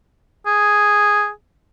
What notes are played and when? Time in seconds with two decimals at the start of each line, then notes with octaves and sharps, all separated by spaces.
0.46 G#4